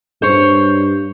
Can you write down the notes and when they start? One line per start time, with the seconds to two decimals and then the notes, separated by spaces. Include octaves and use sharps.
0.22 G2 C5 C#5